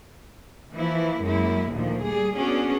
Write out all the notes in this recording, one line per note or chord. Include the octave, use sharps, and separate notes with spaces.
E3 F3 A#3 E4
F#2 G#3 A#3 E4
D2 A#2 D#3 F3
G3 G#4
B3 C#4 D4 F#4 G#4